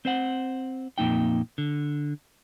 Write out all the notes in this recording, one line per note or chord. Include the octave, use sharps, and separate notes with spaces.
C4 C5 F#5
F2 A#2 A#3 D#4 G5
D3